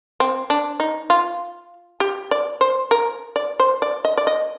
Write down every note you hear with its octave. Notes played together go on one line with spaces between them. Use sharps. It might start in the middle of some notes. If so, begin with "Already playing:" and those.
C4
D4
D#4
F4
G4
D5
C5
A#4
D5
C5
D5
D#5
D5
D#5